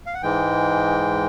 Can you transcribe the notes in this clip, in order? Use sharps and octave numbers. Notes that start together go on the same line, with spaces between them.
F5
F#5
G#2 E3 G#3 G5